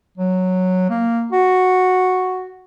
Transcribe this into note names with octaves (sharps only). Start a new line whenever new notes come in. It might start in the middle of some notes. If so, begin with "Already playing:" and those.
F#3
A#3
F#4